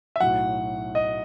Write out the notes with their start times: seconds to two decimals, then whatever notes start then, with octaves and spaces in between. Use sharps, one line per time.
0.16 E5
0.20 B1 A2 F#3 F#5
0.95 D#5